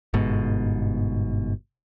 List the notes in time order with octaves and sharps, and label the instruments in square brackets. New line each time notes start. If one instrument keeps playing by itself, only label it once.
[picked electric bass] G1 G#2 B2